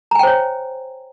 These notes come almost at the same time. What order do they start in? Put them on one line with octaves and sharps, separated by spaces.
A#5 G#5 G5 C5 C#5